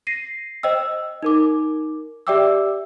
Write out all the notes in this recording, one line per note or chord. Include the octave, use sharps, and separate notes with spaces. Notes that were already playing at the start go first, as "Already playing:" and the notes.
A#6 C7 D#7
C5 D#5 G5 E6
D#4 A#4 D6
G4 D5 E5 G5 D6 E6